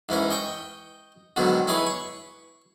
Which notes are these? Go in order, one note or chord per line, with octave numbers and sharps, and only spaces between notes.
G#2 E3 C#4 A#4
D#5 G5 C#6
G#2 B2 D3 D#3 F#3
D#4 E4 G#4 B4 C#5
C#6